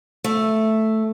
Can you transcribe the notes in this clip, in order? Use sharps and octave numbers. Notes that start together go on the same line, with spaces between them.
A3